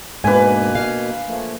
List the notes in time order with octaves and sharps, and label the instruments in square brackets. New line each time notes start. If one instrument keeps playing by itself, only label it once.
[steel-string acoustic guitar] G#2 D4 [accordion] B2 A#3 [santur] B4 G#5
[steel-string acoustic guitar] F5
[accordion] F3 A3 A#3